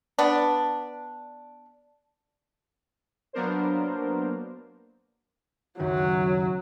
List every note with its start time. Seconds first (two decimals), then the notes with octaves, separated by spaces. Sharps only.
0.19 B3 D4
3.33 F#3 A#3 B3 D4 A#4 C5
5.80 C#2 F#2 D#3 F#3